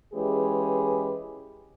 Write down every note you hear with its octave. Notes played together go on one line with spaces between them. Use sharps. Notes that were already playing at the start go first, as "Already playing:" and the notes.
E3 G#3 C#4 G4 G#4 B4